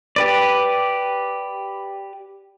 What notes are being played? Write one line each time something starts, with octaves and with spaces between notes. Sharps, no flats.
G4 B4 D5